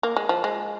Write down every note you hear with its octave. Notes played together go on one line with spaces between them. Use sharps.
A#3
G#3
F3
G#3